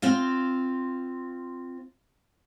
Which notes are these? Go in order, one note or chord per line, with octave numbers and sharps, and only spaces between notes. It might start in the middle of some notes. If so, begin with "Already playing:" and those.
C4 F4 F5